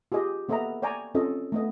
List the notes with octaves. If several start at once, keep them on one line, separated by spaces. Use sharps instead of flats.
F4 G4 G#4 D#5
A#3 B3 A4 D#5 E5 A#5
C#5 D5 G5 G#5 A#5
C4 C#4 F4 A4 D#5
A3 B3 D#5